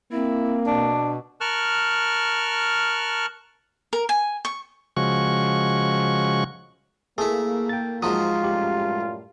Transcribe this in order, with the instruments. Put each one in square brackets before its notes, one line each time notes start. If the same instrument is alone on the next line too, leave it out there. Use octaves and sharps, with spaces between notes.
[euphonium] A#3 [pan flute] C4 [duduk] E4
[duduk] B2 [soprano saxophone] D4
[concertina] A#4 A5 C#6 F6 F#6
[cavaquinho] A#4
G#5
C#6
[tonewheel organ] C#3 F3 G#3 F#4 C#6
[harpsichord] A3 E4 [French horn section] A#3 [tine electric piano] G#4
[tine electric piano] G5 A6
[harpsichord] G#2 F3 F#3 [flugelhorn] F4 [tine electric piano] D#6
[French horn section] F#2 A2 G3 [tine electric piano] G4